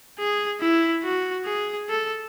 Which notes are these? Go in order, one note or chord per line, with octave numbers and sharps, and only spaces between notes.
G#4
E4
F#4
G#4
A4